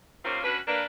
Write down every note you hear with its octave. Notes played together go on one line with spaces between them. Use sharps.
C3 D#3 A#3 C4 C#4 F4
C#4 D4 F#4 B4
A#3 D4 B4